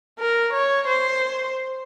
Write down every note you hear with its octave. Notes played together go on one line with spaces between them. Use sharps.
A#4
C#5
C5